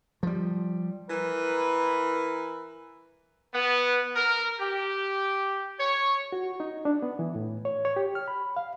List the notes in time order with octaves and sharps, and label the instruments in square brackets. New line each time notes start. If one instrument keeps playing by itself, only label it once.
[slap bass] F3 G3
[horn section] E3 A#4 B4
B3
A#4
G4
C#5
[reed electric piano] F#4
D#4
D4
B3
E3
A2
C#5
C#5
G4
F6
B5
F5